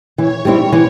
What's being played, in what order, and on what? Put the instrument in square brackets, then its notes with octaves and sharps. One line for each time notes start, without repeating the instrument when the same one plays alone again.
[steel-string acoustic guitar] E3 [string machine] C#5
[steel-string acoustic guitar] G3 C4 E4
E3